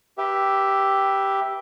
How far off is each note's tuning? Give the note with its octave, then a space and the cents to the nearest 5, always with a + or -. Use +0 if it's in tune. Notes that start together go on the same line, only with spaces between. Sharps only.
G4 +0 B4 -25 E5 +0